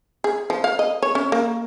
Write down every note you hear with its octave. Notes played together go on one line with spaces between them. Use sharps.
G#4
F3
F5
D#5
C#5
C#4
A#3